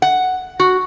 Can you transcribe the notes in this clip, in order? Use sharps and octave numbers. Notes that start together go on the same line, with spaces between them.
F#5
F#4